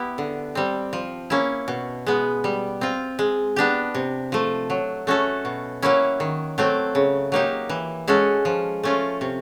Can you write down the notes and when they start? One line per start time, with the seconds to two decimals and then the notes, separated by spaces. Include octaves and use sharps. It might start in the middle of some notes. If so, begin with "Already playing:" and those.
Already playing: B3 E4 G4
0.18 D3
0.55 G3 C4
0.93 F3
1.30 A#3 C#4 E4
1.68 B2
2.07 G#3 B3
2.44 G3
2.81 C4 F4
3.19 G#3
3.56 B3 D4 G4
3.95 C3
4.32 F3 A3
4.70 F#3
5.07 A3 C#4 F#4 A4
5.45 B2
5.82 F#3 A#3 C#4 E4
6.20 D#3
6.58 F#3 A3 C4
6.95 C#3
7.32 F#3 A#3 D#4 G4
7.69 E3
8.08 G#3 C#4 F#4 A4
8.45 F3
8.84 A3 C#4 F4
9.21 C3